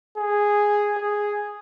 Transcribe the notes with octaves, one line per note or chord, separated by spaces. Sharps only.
G#4
G#4